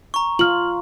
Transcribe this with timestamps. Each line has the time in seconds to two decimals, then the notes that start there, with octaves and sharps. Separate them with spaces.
0.14 A#5 C#6
0.39 F4 F6 F#7